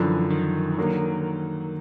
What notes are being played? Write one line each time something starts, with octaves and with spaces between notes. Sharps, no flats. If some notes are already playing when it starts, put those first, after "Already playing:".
Already playing: F#2 D3 E3 F3
D#3
D3 F#3 A#3